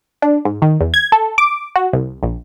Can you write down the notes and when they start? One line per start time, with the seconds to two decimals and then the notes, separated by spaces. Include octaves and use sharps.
0.22 D4
0.45 G#2
0.62 D#3
0.81 E2
0.94 G#6
1.12 A4
1.38 D6
1.76 F#4
1.93 C2
2.23 A#1